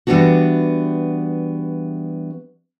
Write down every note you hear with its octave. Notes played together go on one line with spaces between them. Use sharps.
E3 G3 A3 B3 D4 F#4